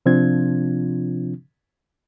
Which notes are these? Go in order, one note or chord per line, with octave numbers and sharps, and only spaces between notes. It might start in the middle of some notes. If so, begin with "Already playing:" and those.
C3 F3 C4 D4 F4 G#6